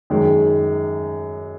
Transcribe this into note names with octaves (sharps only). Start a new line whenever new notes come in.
F#2 D#3 G#3